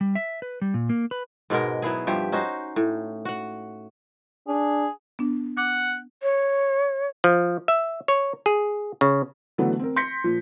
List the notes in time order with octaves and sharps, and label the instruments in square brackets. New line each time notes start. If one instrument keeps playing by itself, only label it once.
[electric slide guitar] G3
E5
B4
G3
A#2
A#3
B4
[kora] G#2 B2 G#3 A#4
F#3 B3 E4 G#4
G2 F3 G4 E5
C#4 D#4 F#4 C5
A2
F#4 F#5
[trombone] D4 [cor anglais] G#4
[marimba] B3 D4
[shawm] F#5 [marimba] D6
[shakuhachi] C#5
[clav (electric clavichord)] F3
E5
C#5
G#4
C#3
[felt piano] D3 E3 F#3 A3 B3
C4 A#4
C6 G6 A#6 B6 C#7
A#2 F3